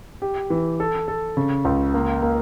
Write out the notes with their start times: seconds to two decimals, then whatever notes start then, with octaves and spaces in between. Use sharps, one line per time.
0.22 G4
0.50 E3
0.80 A4
1.08 A4
1.37 C#3
1.65 C#2
1.94 A#3
2.22 A#3